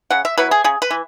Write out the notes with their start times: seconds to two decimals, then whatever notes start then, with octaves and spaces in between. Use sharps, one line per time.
0.10 C#3 F#5
0.25 E5
0.38 F#3 B3 E4 B4
0.51 G#4
0.64 C#3 G#4
0.82 B4
0.91 E3